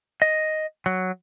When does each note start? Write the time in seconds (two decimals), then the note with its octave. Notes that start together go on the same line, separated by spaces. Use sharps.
0.22 D#5
0.86 F#3